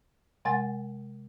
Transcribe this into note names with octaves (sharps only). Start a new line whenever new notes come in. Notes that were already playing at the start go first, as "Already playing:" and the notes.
C3 G#3 F#5 G#5 A6